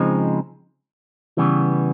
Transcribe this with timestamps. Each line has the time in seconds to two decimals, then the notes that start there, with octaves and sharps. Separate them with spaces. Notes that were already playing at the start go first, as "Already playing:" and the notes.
Already playing: C#3 F3 G#3 C4 D#4
1.37 C#3 E3 G3 B3